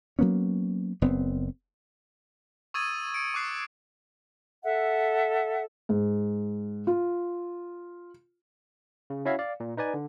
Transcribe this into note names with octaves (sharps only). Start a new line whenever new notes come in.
F#3 A#3 B3 C#4
F#1 B3 C4
C#6 D#6 E6 G#6 A6 D#7
C#7 D7
C#6 D6 F#6 C7 D#7
A4 E5 F#5
G#2
F4
C#3
C#4 E4 F#4 C#5 E5 F5
D5 F5
A#2
D#4 B4 D5 G#5
D3